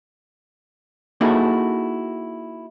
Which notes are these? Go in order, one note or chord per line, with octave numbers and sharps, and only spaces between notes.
A#3 D#4 E4 F#4 G#4 A4